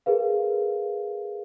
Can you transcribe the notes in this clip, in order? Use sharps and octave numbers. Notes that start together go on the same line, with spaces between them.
G#4 A#4 B4 F5